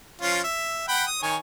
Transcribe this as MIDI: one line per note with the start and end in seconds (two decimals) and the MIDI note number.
0.21 0.42 53
0.21 0.42 61
0.21 0.42 65
0.44 0.86 76
0.88 1.05 78
0.88 1.05 79
0.88 1.05 83
1.07 1.20 87
1.23 1.36 51
1.23 1.36 73
1.23 1.36 80